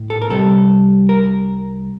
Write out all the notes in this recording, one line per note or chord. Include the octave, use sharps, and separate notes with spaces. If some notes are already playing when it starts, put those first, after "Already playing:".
Already playing: A2
A4
A#4
C2 C3 G3 A4
A#4